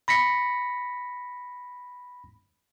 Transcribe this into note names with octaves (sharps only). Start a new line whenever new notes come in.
B5 A#6 B6 C#7